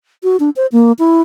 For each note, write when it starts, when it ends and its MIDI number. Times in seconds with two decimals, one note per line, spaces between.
0.23 0.37 66
0.40 0.50 62
0.56 0.67 72
0.72 0.92 58
0.99 1.22 64